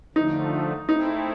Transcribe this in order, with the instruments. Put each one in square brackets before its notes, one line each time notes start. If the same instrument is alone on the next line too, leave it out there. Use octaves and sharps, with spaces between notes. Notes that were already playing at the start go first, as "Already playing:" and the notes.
[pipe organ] D3 F3 A3 [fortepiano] D#4
[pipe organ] A3 C4 E4 [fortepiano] D#4